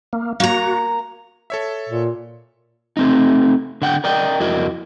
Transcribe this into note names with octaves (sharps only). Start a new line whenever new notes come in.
A#3
A#3 F#4 A#5
A4 C#5 E5
A#2
A3 C4 D#4
D3 F#5 G5
A#4 D5 D#5 G5
F2 E4 F#4 A#4 D#5